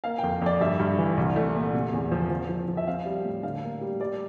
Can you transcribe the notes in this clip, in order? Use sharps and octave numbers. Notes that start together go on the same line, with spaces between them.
A#3 F5
F2 G5
F2 D5
G2 E5
G2
E3
C2
A3
A#2
C3
E2
F3
F3
F3
F3
E5
C4 F5
G3
A2
D3 F5
A#3
G3
G3 D5